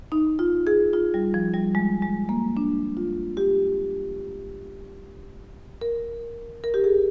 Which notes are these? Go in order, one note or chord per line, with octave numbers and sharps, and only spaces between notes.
D#4
F4
G#4
F4
G3
F3
G3
G#3
G#3
A#3
D4
F4
G4
A#4
A#4
G4
G#4